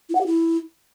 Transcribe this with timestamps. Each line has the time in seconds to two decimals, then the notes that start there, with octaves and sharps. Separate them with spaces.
0.09 E4
0.15 F#5
0.20 G4
0.26 E4